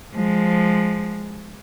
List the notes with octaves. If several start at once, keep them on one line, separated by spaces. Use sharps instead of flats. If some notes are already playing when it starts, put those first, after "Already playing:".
F3 G#3